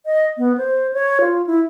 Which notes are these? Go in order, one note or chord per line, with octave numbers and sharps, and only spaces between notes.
D#5
B3
C5
C#5
F4
E4